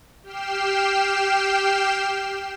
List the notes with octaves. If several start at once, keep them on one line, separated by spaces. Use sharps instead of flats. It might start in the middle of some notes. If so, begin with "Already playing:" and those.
G4 G5 F6 C7 E7